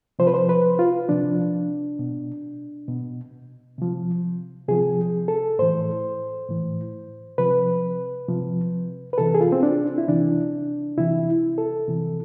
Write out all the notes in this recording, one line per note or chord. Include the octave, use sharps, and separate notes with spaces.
C3 F3 C5
B4
C5
B4
F4
C3 F3 D4
B2
B2
C3 F3
C3 F3 G#4
A4
A2 E3 C5
A2 E3
C3 F3 B4
C3 F3
B4
C3 E3 A4
G#4
F4
C4
D4
E4
C3 E3 D4
C3 E3 E4
A4
C3 E3